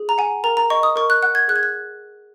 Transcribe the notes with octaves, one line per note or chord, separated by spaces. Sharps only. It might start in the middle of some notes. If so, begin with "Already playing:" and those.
Already playing: G#4
A#5
F#5 G#5
A#4 A#5
A#5
D#5 C#6
D#6
A#4 C#6
F#6
F#5 F#6
G#6
G#4 F#6
G#6
F#6